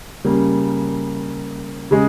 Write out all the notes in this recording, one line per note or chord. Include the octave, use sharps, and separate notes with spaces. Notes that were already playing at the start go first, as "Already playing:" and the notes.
C#3 G3 A#3
C#3 G#3